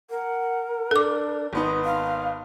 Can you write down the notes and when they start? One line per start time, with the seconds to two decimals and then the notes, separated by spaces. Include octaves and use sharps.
0.10 A#4 F#5
0.91 D4 A4 D6
1.53 G#1 B3 D#4 C6
1.85 F5